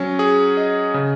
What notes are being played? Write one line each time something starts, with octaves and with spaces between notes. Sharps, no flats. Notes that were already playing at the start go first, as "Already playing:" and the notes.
Already playing: F#3 C#4
G#4
D#5
C#3